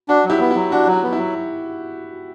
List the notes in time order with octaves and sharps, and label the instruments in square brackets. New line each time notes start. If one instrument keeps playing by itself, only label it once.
[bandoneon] D4 [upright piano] F#4
[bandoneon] F#3
[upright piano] E4 G4
[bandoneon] B3
[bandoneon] F#3 [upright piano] E4
[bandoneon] D4 [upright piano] F#4
[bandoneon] F#3
[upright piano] F#4
[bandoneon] B3
[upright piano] E4
[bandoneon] F#3